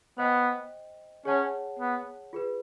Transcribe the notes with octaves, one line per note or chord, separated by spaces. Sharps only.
B3 C5 D#5 G5
C#4 G#4 C#5 F#5 A5
B3
F4 G#4 B4